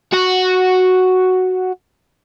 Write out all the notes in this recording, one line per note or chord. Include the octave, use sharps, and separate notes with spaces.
F#4 F#5